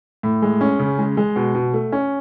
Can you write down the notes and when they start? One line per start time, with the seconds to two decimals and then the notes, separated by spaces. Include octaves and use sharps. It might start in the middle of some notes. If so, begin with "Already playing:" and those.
0.23 A2
0.42 G#3
0.61 C#4
0.79 C#3
0.98 G#3
1.17 G#3
1.36 B2
1.55 B2
1.73 A3
1.92 C#4